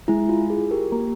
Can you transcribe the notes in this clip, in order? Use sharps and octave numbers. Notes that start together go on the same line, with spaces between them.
G#3 E4
F4
G#4
G4 A#4
A#3